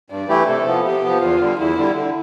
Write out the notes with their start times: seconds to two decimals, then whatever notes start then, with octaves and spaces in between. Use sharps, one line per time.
0.10 G2 D5
0.28 E3 A3 E4 G4
0.47 C3 A4
0.66 F3 B3
0.84 C3 G4
1.03 F3 B3
1.21 E2 F4
1.40 D3 G3
1.59 E2 E4
1.77 D3 G3
1.95 D3